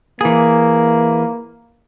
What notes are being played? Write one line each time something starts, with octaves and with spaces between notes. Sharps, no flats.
E3 A#3 G#4